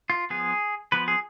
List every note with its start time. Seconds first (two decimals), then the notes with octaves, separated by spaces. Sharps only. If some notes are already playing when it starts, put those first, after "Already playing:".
0.10 F4
0.30 F3 B3 G#4
0.92 F3 B3 B4
1.08 G#4